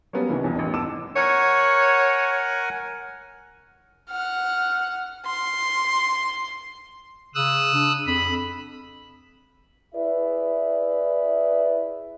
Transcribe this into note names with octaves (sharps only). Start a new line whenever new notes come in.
F#3 G3 A#3 B3 C#4
C2 D#3 E3
D#1 B1 E2
A1 B3
E2 G#2 A5 D6 E6 E7
A#4 C#5 F#5 G#5
F#5 F6
C6
C#3 D#6 E6 F#6
D4
F2 B5
E4 G#4 B4 D5 E5